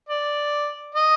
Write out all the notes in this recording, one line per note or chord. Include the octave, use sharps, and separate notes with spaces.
D5
D#5